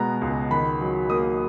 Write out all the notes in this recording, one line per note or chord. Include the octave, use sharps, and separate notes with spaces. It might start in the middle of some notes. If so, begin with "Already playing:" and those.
Already playing: B2 G#3 B3 A#5
C#2
D#3 B5
F#3
A#3 D#6